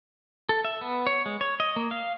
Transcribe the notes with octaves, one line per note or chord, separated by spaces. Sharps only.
A4
E5
B3
C#5
G#3
C#5
D#5
A#3
F5